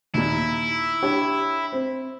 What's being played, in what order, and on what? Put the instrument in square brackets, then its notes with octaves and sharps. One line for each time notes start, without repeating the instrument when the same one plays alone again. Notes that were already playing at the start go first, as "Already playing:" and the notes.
[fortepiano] D#2 A#2 [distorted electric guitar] E4
[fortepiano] D4 G4 C#5
C4